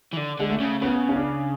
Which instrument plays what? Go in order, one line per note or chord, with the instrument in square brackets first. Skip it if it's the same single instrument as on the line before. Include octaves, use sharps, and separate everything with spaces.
[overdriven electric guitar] E3
D3
[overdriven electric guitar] D3 [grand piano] G#3
[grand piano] A3
[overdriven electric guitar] C#3
[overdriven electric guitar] C#3 [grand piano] B3
[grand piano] C#4
D4